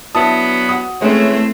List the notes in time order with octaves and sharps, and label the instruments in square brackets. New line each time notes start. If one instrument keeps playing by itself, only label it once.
[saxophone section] F#3 B3 D4 [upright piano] E4 A5 D#6
[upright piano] F#4 D#6
[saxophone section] E3 E4 C#5 [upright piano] G#3 C#4 [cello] A3 C4